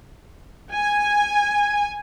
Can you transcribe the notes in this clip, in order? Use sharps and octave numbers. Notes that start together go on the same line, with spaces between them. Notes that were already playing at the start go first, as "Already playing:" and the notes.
G#5